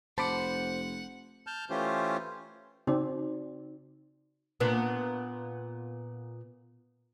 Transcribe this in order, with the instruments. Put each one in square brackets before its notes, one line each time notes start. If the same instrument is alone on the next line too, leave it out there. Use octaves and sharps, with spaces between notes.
[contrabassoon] F1 [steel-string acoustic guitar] C5 [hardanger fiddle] F#5 [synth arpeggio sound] A5 B5 D6
[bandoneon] A5 F6 G6
E3 A3 C#4 F4 G4 C5
[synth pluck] C#3 D5 [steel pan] C4 [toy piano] D#4 F#4
[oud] A#2 B3 D4